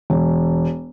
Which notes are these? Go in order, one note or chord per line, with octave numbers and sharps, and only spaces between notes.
E1